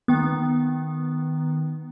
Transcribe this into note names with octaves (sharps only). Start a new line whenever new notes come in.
D#3 B3